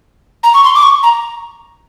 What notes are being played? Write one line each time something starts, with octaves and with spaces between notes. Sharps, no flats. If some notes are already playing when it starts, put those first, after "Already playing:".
A#5
C#6
C6
D6
C#6
A#5